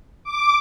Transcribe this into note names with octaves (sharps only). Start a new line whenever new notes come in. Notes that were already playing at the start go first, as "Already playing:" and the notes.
D6